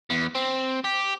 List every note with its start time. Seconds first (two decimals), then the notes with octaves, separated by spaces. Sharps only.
0.10 E2
0.35 C4
0.85 G4